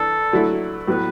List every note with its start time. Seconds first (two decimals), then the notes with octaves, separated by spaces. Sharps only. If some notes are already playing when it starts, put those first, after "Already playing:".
Already playing: E3 D4 A4
0.32 D3 F#3 A3 E4
0.88 A2 F#3 B3 B4